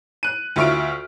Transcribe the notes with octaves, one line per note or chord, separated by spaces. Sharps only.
F#6 D#7
D2 F4 E5 C#6 F6 D7